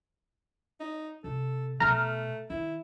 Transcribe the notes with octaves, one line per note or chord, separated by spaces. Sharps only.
D#4
C3 A4
B1 B2 A3 A#5 F6
D#3 E4